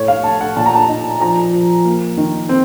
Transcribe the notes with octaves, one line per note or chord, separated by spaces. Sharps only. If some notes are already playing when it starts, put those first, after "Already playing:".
Already playing: A2 C#5
F5
A3 A5
F#5
A#2 A5
A#5
A5
D#4
F3 A#5
F3
A#3
D#3
C4